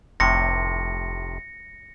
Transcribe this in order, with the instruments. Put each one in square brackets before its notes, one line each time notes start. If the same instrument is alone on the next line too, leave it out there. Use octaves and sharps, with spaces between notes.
[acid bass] F1 [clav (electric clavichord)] A2 C3 [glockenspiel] A#6 C#7